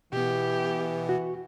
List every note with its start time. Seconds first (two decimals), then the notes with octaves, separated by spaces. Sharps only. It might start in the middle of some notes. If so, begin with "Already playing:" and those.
0.13 B2 E3 B3 G4
1.09 F#4